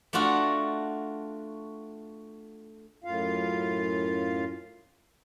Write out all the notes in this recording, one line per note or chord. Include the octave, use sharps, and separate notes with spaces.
A3 D4 F4 F#4
F#2 A2 F4 F5